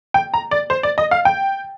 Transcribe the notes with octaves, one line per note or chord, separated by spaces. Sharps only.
G5
A#5
D5
C5
D5
D#5
F5
G5